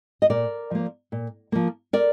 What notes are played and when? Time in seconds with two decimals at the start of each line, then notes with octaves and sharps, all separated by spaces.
0.22 D#5
0.29 A#2 A#4 D5
0.71 F3 A#3
1.12 A#2
1.52 F3 A#3
1.93 A#4 D5